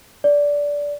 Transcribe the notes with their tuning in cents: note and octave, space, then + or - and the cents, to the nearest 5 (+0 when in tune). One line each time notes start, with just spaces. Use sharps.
D5 -15